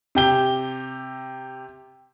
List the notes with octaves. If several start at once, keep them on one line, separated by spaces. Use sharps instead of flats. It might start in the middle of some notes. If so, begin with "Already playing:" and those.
C3 G4 G7